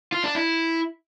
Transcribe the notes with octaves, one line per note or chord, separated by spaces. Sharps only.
F4
D4
E4